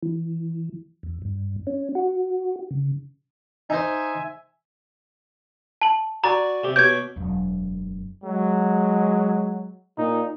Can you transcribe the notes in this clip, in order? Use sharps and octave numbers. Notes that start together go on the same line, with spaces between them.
E3
E2
G2
C#4
F#4
C#3
D#4 C5 E5 G#5
A5 F#7
F#4 D5 G#5 A#5
C3 G4
B2 C#5 D6 G6 G#6
E1 F#2
F#3 G#3
A#2 D#4